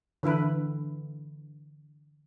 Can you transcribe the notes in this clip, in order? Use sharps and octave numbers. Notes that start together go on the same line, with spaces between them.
D3 E3 E4 B4